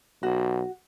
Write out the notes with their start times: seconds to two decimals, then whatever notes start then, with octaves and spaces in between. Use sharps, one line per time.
0.23 B1 F#4